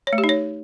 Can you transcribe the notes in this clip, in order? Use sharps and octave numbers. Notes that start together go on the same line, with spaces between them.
C#5
A3
G4
D#4
C#5